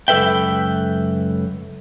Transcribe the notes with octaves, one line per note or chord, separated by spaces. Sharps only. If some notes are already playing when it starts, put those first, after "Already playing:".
C#2 F#2 A4 B4 E5 G5